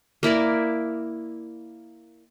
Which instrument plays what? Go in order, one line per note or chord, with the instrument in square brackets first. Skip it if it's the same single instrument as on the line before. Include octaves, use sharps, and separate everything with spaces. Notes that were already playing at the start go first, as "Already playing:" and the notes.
[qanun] A#3 E4 A#4 D5